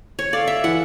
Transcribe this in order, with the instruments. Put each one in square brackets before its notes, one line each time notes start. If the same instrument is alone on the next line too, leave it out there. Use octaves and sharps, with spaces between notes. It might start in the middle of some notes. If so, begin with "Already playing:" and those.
[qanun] C#5
[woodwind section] A4 F5 [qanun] D5
[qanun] E5
[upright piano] E3 [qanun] F#5